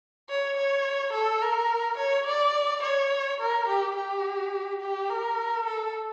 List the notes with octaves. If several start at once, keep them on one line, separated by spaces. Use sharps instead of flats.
C#5
C#5
A4
A#4
C#5
D5
C#5
A#4
G4
G4
G4
A#4
A4